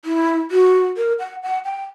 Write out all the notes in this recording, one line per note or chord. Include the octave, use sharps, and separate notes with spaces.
E4
F#4
A#4
F#5
F#5
G5